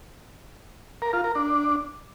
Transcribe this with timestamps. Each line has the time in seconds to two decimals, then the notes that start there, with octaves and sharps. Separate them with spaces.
1.02 A#4
1.13 F4
1.24 A#4
1.35 D4